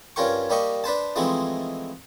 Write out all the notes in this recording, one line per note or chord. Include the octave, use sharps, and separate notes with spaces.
G2 C#4 F4 A#4 G5 C#6
G3 A#3 G4 D#5 C#6
D4 B4 C5 A5
E3 F3 G#3 A3 C4 D#4